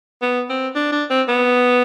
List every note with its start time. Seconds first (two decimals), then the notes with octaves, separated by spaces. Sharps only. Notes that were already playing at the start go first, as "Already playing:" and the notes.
0.22 B3
0.49 C4
0.75 D4
0.92 D4
1.10 C4
1.28 B3